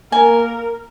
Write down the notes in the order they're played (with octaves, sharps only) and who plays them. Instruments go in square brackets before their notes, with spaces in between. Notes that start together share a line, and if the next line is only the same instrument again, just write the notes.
[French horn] A#3 [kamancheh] A#4 [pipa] G#5